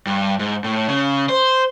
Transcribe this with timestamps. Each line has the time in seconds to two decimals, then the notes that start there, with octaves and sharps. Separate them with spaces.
0.07 G2
0.39 G#2
0.64 A2
0.88 C#3
1.29 C5